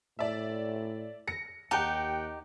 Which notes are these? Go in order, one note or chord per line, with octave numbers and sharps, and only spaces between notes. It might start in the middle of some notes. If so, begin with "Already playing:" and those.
A2 D5 E5
A#6 C#7
D#2 D#4 G4 F#5 G5